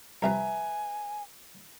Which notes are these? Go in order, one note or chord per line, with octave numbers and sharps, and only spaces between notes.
C2 C3 F3 B4 E5 G#5 A#5